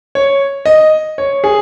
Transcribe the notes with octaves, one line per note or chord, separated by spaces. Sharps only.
C#5
D#5
C#5
G#4